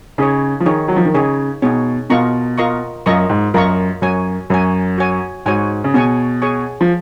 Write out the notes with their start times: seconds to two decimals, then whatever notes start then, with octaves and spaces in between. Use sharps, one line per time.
0.18 C#3 D#4 G#4 C#5
0.60 F3
0.66 D#3 D#4 G#4 C#5
0.88 F#3
0.96 F3
1.05 D#3
1.14 C#3 D#4 G#4 C#5
1.62 B2 D#4 G#4 C#5
2.10 B2 F4 A#4 D#5 A#5 C#6
2.58 F4 A#4 D#5 A#5 C#6
3.06 F#2 F4 A#4 D#5 A#5 C#6
3.30 G#2
3.54 F#2 F4 A#4 D#5 A#5 C#6
4.02 F#2 F#4 C#5 G#5
4.50 F#2 F#4 C#5 G#5
4.98 F#4 C#5 G#5
5.46 G#2 F#4 C#5 G#5
5.84 C#3
5.94 B2 G#4 C#5 G#5 C#6
6.42 G#4 C#5 G#5 C#6
6.81 F3